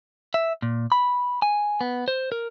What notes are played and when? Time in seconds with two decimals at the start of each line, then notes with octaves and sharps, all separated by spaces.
0.34 E5
0.62 A#2
0.92 B5
1.42 G#5
1.81 B3
2.08 C5
2.32 A#4